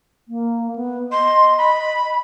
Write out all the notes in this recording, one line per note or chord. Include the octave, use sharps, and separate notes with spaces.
A#3
B3
D#5 C6
B5